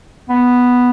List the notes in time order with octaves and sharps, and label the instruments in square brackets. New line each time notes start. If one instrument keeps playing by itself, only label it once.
[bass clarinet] B3